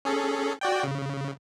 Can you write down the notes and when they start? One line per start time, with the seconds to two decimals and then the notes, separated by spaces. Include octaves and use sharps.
0.05 C#4 G#4 A4
0.61 F#4 D5 G5
0.83 C#3